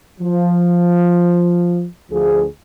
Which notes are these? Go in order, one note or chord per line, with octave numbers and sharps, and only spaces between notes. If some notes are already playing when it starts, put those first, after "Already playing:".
F3
D2 F3 G#4